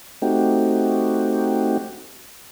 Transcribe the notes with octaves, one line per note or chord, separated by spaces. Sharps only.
A3 C4 D#4 F#4 G4